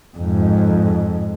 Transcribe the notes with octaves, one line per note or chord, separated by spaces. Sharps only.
F2 G#2